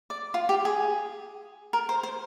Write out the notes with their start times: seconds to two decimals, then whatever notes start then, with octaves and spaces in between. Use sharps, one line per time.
0.10 D5
0.34 F4
0.49 G4
0.65 G#4
1.73 A#4
1.89 C5
2.03 C5